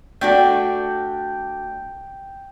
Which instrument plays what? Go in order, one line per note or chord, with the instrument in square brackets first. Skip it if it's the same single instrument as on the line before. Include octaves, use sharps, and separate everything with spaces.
[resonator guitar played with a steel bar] A3 D4 F#4 [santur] G5